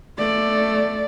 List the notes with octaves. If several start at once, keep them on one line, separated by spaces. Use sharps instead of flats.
A3 D5